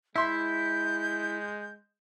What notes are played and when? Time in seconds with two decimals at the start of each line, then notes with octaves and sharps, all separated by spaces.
0.16 G#3 E4 E5 C6 G6